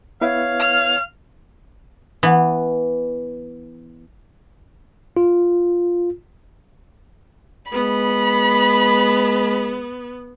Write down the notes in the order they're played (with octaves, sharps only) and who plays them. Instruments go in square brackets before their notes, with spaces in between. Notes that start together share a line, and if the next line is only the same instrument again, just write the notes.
[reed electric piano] B3 E4 B4 [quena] C#5 [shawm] F5
[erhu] F6
[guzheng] E3 B3
[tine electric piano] F4
[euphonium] G#3 [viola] B3 [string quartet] B5